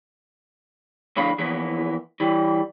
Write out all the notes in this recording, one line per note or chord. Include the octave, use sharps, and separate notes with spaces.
A2 D3 F3 D4 F5 B5
E3 F3 A#3 B3 E4
E3 G3